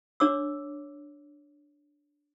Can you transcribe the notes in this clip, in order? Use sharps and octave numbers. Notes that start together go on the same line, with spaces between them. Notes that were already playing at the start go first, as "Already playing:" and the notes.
D4 C#5 D6 E6